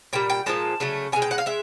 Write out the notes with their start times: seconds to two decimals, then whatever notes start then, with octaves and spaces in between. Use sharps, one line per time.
0.13 A#2 G3 G5
0.30 G5
0.46 A#2 F3 G#3 A5
0.80 C#3 F#3 A3
1.12 B2 G#5
1.16 G#3
1.22 G5
1.31 F#5
1.38 F5
1.46 G#3 E5